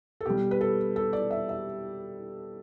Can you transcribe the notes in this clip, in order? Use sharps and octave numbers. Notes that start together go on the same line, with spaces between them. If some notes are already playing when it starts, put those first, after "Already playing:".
A4
B2 G3 G4
B4
A4
A4
D5
E5
E5